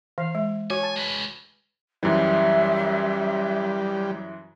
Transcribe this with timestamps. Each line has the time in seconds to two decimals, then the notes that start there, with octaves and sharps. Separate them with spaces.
0.18 E3 F5
0.35 G#3
0.70 F#4 C#5 G#5
0.83 A5
0.96 G#3 B4
2.03 F#2 E3 G3 E5